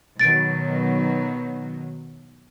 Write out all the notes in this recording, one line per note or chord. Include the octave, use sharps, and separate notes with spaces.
B2 D#3 F#3 A6 D7